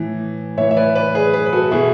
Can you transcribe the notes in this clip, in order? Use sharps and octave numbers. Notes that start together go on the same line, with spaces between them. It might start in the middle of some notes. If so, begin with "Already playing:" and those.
Already playing: A2 E3
A2 E3 C#5 E5
E5
B4 D5
B4 D5
G#4 B4
G#4 B4
B4
F#4 A4
B2 E4 G#4